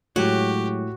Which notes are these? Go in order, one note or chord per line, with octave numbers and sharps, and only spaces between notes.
A2 F#3 G#3 F#4 G4 C#5